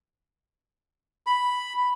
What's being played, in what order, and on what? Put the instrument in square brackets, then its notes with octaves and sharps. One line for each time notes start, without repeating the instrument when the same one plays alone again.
[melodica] B5